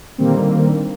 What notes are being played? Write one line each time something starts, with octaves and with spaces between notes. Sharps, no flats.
A#2 D3 D#3 G3 A#3 C4